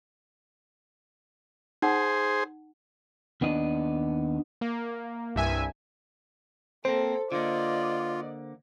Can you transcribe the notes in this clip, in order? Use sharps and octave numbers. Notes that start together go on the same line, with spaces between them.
D#4 G#4 C5 F#5
D#2 B3 D4 D#5
A#3
C2 G2 E5 G#5
A#3 C4 A4 C5
D3 A#3 F4 D5 D#5